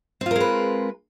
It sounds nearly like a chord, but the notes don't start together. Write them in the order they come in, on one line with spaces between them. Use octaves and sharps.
C4 F4 A#4 G#3 B4